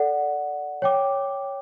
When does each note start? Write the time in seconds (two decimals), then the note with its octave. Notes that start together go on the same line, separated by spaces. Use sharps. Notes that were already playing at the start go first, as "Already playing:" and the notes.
Already playing: A4 D5 F#5
0.82 C#5 G5 D6